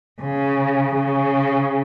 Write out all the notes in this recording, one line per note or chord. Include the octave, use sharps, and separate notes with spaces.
C#3
C#3